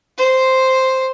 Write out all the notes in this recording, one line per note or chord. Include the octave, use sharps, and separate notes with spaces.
C5